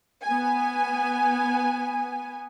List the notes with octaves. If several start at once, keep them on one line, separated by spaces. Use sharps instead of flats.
B3 G#5